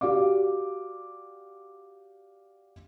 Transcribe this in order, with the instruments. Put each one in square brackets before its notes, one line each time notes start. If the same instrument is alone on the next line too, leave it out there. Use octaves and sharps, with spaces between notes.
[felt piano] F#4 G4 D5 F5 D6